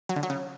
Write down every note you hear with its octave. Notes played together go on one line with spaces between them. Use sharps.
F#3
D3
F#3
C#3